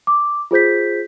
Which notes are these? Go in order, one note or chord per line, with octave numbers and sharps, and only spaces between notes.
D6
F4 G#4 C5 G6 B6